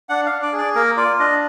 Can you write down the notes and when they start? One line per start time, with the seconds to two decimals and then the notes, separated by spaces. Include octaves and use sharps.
0.09 D4 F#5
0.26 F5
0.31 D4
0.42 D5
0.53 G#4
0.58 D5
0.75 A#3 A#4
0.97 F4 D5
1.19 D4 D#5